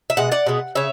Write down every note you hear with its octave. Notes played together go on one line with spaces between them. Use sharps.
E5
B2 G#3 F#5
D5 F#5
B2 G#3 B3
C#3 C#5 E5